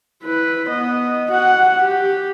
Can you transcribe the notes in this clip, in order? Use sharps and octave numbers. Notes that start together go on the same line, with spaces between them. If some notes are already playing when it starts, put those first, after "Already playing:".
E4 B4
B3 D#5
F#4 F#5
G4